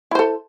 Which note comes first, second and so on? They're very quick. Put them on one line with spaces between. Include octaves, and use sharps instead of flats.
E4 C5 A4